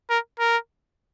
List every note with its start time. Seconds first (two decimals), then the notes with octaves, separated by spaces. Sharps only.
0.10 A#4
0.39 A#4